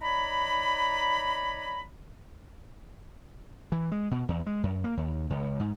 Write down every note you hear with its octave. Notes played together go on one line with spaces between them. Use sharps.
D#4 C#5 D5 A#5 B5
E3
G#3
B2
E2
G#3
F#2
A#3
D#2
C#2
G#2